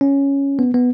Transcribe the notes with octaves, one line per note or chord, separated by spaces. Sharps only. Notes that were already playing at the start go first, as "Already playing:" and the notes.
C#4
B3
B3